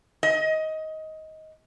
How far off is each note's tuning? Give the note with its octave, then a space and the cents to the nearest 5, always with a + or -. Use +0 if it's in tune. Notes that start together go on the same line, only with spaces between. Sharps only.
D#5 +15